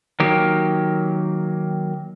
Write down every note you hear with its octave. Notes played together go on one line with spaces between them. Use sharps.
D#3 F#3 A#3 G4